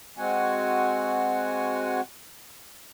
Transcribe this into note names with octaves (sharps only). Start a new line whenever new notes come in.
G#3 C4 F#4 F#5 G#5